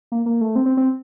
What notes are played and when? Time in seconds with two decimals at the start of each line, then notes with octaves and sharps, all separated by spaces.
0.12 A#3
0.26 A#3
0.41 A3
0.56 C4
0.66 C4
0.77 C4